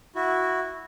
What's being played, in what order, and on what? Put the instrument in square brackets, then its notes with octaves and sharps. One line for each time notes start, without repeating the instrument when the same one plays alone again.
[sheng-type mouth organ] E4 F#4